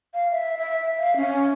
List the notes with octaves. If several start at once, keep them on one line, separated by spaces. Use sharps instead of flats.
F5
E5
E5
F5
C#4